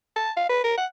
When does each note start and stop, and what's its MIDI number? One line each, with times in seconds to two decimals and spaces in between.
0.16 0.31 81
0.37 0.46 77
0.49 0.61 71
0.64 0.76 70
0.78 0.86 78